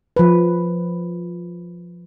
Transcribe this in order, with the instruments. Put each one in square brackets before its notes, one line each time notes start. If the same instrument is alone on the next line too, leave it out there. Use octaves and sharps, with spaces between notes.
[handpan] F3 B4